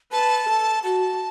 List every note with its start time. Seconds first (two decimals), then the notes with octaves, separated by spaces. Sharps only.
0.12 B4 A5
0.48 A4
0.83 F#4 A5